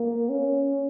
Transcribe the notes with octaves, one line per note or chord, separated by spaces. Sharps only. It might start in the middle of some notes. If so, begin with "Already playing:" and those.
Already playing: A#3
C#4